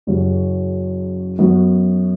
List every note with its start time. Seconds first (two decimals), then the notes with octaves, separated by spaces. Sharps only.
0.07 F#1 F#2 C#3 F#3 C#4
1.39 F#2 F#3 B3 F#4